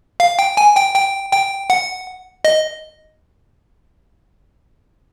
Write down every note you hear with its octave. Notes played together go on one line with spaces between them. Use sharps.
F5
G5
G#5
G5
G5
G5
F#5
D#5